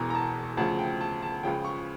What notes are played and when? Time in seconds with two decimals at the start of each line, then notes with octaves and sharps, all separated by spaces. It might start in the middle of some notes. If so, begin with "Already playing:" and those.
Already playing: E1 E2 E3 A#5
0.10 A#5
0.15 A5
0.57 D2 C#3 F3 A5
0.79 G5
1.01 A5
1.22 A5
1.43 C#2 C#3 F3 G5
1.65 C#6